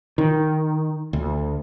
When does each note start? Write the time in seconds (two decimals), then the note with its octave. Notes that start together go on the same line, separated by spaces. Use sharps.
0.18 D#3
1.13 D2